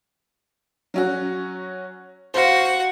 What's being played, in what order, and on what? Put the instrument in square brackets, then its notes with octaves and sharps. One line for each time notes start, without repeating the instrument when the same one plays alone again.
[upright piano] F#3 C#4 F#4
[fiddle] F#4 F#5 [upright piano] C5 F5